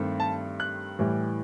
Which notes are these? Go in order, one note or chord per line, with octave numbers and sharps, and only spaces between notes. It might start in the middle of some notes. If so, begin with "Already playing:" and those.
Already playing: G2 D#3 A3 C4
A5
F#6
A2 E3 G3